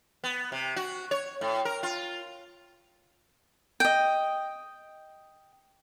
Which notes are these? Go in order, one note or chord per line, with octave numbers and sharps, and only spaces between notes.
B3
C3
F#4
C#5
A2
A#4
F4
D#5 G5